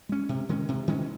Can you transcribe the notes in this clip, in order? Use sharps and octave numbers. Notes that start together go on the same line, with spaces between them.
G#3 C#4
C3
D#3 G#3 C#4
C3
D#3 G#3 C#4